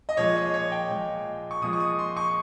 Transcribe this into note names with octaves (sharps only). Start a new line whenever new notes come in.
D#5
A#2 F3 G#3 C#5
D#5
C#5
G5
A#2 F3 G#3
C#6
A#2 F3 G#3 D#6
C#6
D#6
C6
C#6